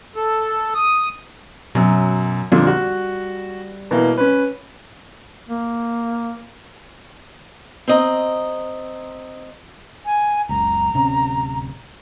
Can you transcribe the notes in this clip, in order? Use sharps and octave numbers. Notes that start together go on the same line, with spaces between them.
A4
D#6
F#2 B2 F#3
F2 A#2 D3 G3
F#4
B2 E3 A#3
C#4 B4
A#3
C4 D#5 A#5
G#5
F#1 C#2 A#5
D1 C3 C#4